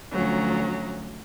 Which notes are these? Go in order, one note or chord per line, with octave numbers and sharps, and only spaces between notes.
D2 F3 F#3 C#4 A#5